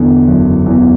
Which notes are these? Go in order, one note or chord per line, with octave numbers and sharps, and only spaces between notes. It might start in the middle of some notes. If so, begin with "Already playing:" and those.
Already playing: E2 D3
F#1
E2